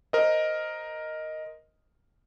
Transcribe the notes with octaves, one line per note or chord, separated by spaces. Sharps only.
A#4 C5 D#5